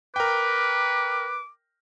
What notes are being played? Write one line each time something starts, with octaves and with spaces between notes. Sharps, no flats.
A#4 B4 G5 D6